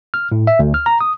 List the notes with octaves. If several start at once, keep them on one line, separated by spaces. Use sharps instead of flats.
F6
A2
E5
D2
F6
A#5
D#6